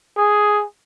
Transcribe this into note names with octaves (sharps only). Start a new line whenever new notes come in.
G#4